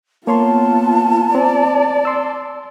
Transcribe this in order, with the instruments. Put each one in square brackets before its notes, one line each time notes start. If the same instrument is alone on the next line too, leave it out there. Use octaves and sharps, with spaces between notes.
[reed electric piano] A#3 C#5 C6 [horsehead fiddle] B3 F4 [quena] A5
[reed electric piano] C4 [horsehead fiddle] D5
[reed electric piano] C6 E6